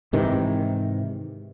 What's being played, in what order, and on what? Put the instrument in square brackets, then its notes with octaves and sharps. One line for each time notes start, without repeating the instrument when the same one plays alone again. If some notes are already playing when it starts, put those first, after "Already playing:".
[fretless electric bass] G#2 C3 D#3 E3